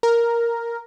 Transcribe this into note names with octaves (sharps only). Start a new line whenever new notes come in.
A#4